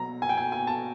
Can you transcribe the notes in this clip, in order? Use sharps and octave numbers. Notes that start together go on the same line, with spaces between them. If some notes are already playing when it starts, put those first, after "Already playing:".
Already playing: B2 F#3 A#5
G#5
G5
G#5
G#5
A5